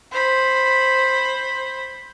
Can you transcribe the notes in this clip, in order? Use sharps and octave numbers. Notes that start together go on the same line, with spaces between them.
C5 B5